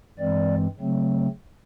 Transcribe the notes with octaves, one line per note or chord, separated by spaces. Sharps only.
G2 E3 G#3 C4 D5
C#3 F#3 A3 C4